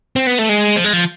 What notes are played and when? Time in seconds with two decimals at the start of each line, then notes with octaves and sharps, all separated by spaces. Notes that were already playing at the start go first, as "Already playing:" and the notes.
0.16 C4
0.27 B3
0.39 A3
0.49 G#3
0.76 F3
0.85 G#3
0.93 F3